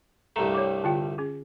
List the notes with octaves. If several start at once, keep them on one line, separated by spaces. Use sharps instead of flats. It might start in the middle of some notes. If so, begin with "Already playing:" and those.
C2 G2 A3 A#5
C#5 G5 D6
D3 F4 G5
C#4 G#4